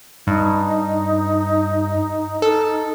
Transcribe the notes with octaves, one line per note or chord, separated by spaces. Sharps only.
G2 D#4
D#4 A4